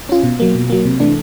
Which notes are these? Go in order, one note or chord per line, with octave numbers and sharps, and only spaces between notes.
C#4 F4
B2
F#3 A#3
B2
F#3 A#3
C3
E3 A3 D4